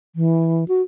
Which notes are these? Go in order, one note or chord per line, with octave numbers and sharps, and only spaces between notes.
E3
F#4